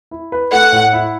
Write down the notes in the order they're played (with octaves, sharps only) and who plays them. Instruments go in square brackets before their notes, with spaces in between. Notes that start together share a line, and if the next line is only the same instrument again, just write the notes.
[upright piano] E4
B4
[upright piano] A3 [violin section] F#5
[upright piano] A2
E4